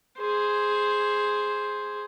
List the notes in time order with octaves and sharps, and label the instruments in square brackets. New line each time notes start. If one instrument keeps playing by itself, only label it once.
[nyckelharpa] G#4 C5